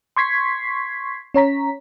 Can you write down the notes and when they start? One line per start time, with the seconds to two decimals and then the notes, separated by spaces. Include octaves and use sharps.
0.16 C6 C#6 G#6 B6 C7
1.34 C#4 C#5 A#5 B6